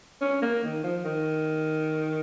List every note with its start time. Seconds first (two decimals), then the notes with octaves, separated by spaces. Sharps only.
0.21 C#4
0.42 A#3
0.63 D#3
0.83 F3
1.05 D#3